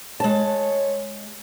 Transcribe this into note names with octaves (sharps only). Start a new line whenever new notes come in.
G#3 C#5 A5